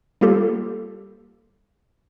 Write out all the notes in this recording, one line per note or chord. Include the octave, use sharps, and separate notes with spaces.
G3 A#3 F4 G4 A4